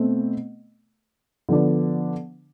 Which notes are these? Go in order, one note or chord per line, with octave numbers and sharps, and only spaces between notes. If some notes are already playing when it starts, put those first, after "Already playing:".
Already playing: B2 A3 C4
D3 F3 B3 D4